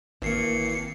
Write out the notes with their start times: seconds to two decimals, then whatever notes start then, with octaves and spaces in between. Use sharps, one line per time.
0.22 G#1 E3 A#3 C7 C#7